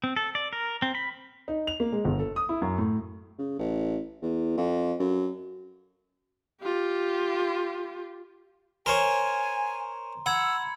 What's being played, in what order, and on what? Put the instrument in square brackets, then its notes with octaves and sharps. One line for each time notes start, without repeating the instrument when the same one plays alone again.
[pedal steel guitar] C4
A4
D5
A#4
C4
B5
[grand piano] D#4
F7
A#3
G#3
G1
A4
D#6
E4
F#2
A2
[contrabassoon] C#3
A1
E2
F2
F#2
[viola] F4 G4
[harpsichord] A#4 C5 C#5 [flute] G#5 [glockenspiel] A#5 C6
[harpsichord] F#5 [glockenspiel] B5 G#6 C#7 [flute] E6